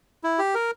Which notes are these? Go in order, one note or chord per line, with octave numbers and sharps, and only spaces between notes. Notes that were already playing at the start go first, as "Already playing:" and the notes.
E4
G4
A#4